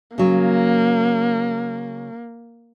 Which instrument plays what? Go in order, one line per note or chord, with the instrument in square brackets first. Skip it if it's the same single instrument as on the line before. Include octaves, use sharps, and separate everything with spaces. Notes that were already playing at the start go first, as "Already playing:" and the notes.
[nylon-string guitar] C#3 F#3 [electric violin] A#3